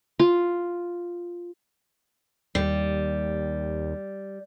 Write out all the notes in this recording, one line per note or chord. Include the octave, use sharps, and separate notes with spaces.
F4
D#2 G3